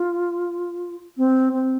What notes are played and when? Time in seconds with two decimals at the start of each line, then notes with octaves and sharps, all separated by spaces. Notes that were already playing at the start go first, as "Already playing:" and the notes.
Already playing: F4
1.17 C4
1.53 C4